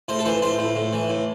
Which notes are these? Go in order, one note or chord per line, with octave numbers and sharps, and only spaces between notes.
A2 C5
A4
E3 C5
A2 C5
A2
A2
E3
A2